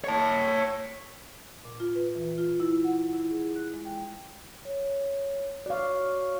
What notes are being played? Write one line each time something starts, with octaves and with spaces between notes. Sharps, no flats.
C#5 A5
A#2
F4
B4
E3
F4
E4
F#5
E4
G#4
F#6
G#3
G5
C#5
F#4 C#5 D5 F5 C#6